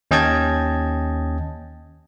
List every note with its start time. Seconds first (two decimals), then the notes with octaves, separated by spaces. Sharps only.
0.11 D#2 C#4 D#5 G5 A5 G#6